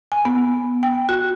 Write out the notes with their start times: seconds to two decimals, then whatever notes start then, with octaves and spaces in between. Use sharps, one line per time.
0.12 G#5
0.25 B3
0.83 G5
1.09 F#4